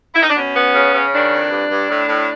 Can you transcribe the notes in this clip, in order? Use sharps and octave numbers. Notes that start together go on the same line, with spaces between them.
E4
D#4
D4
B2 C#4
B3
C#3
C#3
D#3 D4
F2
G2
G2
A2
A2